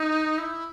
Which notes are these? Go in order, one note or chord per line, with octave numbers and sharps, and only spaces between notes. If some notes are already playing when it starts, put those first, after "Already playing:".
Already playing: D#4
E4